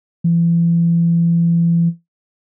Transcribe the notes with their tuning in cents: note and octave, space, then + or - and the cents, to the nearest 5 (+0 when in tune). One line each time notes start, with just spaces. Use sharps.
E3 +40